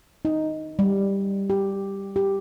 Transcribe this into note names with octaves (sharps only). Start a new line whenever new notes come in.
D#4
G3
G4
G4